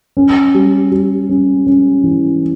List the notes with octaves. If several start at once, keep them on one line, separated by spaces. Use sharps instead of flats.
C#4
G3
G3
C#4
C#4
E3